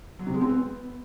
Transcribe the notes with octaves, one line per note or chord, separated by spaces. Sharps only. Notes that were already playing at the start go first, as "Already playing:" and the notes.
F#3
C3
G#3
C4
B3